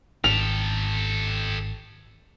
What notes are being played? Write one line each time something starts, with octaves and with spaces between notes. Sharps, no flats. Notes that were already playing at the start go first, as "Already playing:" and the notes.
G#1 G4 A4 F7